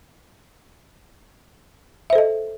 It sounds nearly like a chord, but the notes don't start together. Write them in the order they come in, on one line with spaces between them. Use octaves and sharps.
E5 C5 A4 D#5